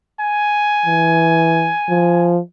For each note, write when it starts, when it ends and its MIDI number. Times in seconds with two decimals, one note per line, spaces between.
0.20 2.33 80
0.86 1.71 52
1.89 2.39 53